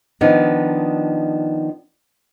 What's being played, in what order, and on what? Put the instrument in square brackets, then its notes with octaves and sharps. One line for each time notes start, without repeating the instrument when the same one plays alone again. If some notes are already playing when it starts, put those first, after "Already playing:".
[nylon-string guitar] D#3 F3 B3 D4 D#4